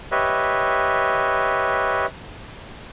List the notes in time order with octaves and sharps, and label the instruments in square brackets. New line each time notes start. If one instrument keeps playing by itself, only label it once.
[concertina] G4 B4 C#5 D#5 E5